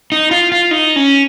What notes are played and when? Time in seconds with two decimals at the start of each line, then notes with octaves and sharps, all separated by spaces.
0.12 D#4
0.31 F4
0.52 F4
0.71 D#4
0.96 C#4